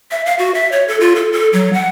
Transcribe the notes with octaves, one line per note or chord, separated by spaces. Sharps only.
E5
F5
F#4
E5
C#5
A4
F4
A4
A4
F#3
F#5